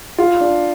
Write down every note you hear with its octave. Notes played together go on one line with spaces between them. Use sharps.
F4
D4